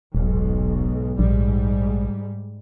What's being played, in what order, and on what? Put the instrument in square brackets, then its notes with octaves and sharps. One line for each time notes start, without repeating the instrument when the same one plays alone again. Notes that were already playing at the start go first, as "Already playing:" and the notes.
[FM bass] D#1 [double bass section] B1 G#2
[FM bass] A#1 [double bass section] G#2 G3